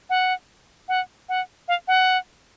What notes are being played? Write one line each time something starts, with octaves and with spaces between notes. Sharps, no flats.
F#5
F#5
F#5
F5
F#5